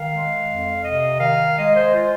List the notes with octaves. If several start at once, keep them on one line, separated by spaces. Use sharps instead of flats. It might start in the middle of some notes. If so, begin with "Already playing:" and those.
Already playing: D#3 F5
G#3
F2
C3 D#5
D#3 F5
G#3 D#5
C5
F4